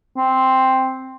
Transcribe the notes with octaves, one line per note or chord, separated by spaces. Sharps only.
C4